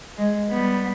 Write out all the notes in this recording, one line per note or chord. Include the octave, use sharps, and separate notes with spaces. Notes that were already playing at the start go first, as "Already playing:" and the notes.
G#3
G3 B3